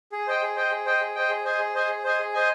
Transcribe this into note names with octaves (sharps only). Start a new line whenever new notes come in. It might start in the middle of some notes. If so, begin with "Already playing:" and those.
G#4
C5 D#5 G5
G#4
C5 D#5 G5
G#4
C5 D#5 G5
G#4
C5 D#5 G5
G#4
C5 D#5 G#5
G#4
C5 D#5 G#5
G#4
C5 D#5 G#5
G#4
C5 D#5 G#5